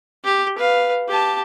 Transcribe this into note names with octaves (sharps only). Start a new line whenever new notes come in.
G4
B4 F5
G4 A5